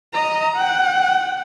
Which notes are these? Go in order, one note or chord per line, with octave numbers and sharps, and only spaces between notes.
D#5 A#5
F#5 G5